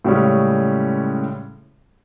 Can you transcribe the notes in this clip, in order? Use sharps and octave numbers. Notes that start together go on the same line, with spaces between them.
A2 C#3 G3 G#3 C#4